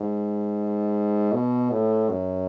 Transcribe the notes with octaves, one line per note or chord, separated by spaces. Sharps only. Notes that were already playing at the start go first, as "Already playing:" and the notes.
Already playing: G#2
B2
A2
F#2